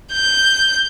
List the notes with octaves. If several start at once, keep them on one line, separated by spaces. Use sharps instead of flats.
G6